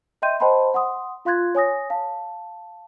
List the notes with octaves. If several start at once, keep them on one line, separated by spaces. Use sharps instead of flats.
D#5 E5 G5 C6 G6 D#7
C5 D#5 G5 A5 B5 C6
F#5 C6 D#6
F4 F5 C6 F#6 G#6 A6
C#5 G#5 D#6 A#6
F5 A5